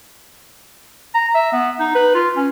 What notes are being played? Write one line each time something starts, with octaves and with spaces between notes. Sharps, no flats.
A#5
E5
B3
D#4
B4
F4
C#4